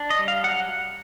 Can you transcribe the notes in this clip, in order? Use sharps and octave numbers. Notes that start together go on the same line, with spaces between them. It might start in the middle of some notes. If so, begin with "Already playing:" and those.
Already playing: D4
D#5
G3
F5
F#3 F#5